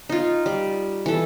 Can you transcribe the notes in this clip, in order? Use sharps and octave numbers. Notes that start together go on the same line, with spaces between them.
D#4 F4
G3
E3 A4